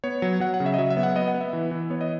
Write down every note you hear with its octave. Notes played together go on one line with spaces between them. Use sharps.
B3 C#5
F#3
F#3 F#5
F#5
C#3
E5
D#5
F#3 E5
E5
B3
F#5
B3 D#5
F#5
B3
E5
E3
E3
B3 C#5
D#5